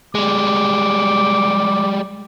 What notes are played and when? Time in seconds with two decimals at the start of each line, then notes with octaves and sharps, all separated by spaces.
0.15 G3 G#3 D6